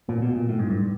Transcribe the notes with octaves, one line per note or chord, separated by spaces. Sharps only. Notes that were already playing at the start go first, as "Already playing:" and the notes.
A#2
B2
A#2
A2
G#2
G2